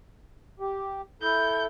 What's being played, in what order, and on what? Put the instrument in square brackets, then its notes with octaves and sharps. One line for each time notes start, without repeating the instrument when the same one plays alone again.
[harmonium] G4
[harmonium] E4 A4 [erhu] G6